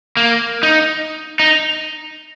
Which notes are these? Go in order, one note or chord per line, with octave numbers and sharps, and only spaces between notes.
A#3
D#4
D#4